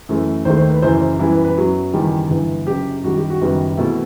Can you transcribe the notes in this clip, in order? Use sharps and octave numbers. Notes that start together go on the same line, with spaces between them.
F#2 E3 A3
D#2 D#3 A3 C5
C5
B4
F#1 F#2 E3 C5
C5
F#2 E3 G3 B3 E4
B4
B4
F#2 F#3 B3
F#1 E2 D#3 G3
G1 G2 E3 B3
F#1 F#2 F#3 G4
F#2 D#3 G3 F#4
G4
F#4
F#1 F#2 D#3 G3 B3
E2 B2 A3 C4 E4